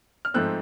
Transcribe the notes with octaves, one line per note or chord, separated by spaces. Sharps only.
F6
G#2 F3 A3 C4 E6 F#6